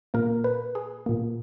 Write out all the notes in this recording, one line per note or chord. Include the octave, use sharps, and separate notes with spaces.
A#2 A#3 A#4
B4
G#4
A#2 A#3